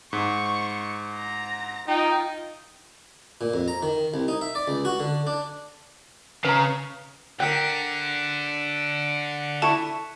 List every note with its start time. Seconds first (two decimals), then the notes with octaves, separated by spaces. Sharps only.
0.13 G#2 C#6
1.15 A#5
1.87 D#4 F4 G5
3.41 A#2
3.54 F2
3.68 A#5
3.83 D#3
4.14 C2
4.28 D#4
4.41 E5
4.55 D5
4.68 C#2
4.85 F#4
5.00 D3
5.27 D4
6.45 C#3 B4 A#5
7.40 D3 A#4 G5 F#6 B6 C#7
9.62 E4 A4 A5 C#6